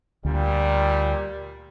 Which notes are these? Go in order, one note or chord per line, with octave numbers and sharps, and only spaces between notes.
D2 A#2 G3